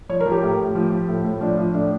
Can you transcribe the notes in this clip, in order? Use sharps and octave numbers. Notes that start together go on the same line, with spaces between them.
F3 C#5
A#4
F3
G4
A2
A2
F3
F3
A2
A2
F3 D4
F3
A2 D4